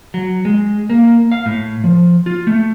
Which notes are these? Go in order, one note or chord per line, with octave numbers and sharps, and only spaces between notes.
F#3
G#3
A#3
F5
A2
F3
F4
A3